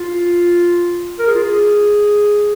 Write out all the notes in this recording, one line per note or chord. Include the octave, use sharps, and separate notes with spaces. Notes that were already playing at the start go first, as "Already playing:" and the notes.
Already playing: F4
A#4
G#4
F4
G#4